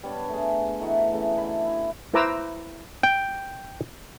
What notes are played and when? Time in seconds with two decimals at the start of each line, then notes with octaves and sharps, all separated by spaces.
0.03 G3 B3 D4 C#5
0.29 A3 D4 G#4
0.80 E3 A3 D#4 F#4
1.13 C#3 A3
1.35 D3 E4 B5
1.65 E4
2.14 E4 B4 C5 A#5 D6 E6
3.03 G5